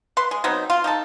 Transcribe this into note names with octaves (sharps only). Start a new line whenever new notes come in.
B4 C6
G#3
F#3 B3 C4 D#4
F4
D#4 G4 A4